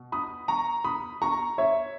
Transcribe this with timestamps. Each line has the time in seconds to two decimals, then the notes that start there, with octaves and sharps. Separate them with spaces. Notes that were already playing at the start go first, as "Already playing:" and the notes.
Already playing: B2
0.12 B5 D#6
0.48 A#5 C#6
0.84 B5 D#6
1.22 A#5 C#6
1.58 C#5 E5